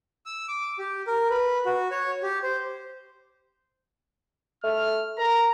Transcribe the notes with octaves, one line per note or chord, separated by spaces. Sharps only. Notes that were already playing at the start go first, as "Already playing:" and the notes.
E6
D6
G4
A#4
B4
F#4
C#5
G4
C5
A3 F6
A#4 A#5